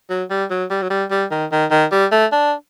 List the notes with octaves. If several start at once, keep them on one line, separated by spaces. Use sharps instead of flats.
F#3
G3
F#3
G3
F#3
G3
G3
D#3
D#3
D#3
G3
A3
D4